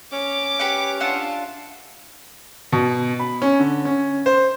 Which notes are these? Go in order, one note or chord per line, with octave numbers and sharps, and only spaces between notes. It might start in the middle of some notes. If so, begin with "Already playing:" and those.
C#4 D6
G4 B4 F#5
D4 F4 E5 F#5
B2
B5
C#4
D3
C#4
C5